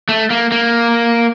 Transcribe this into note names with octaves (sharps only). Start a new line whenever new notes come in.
A3
A#3
A#3